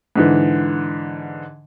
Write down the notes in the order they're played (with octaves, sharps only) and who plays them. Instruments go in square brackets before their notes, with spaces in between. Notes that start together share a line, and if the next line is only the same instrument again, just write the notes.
[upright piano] G#2 D3 E3